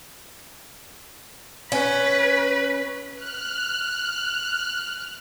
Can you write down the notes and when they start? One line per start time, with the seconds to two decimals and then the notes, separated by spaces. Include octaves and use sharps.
1.72 C#4 B4
3.15 F6 F#6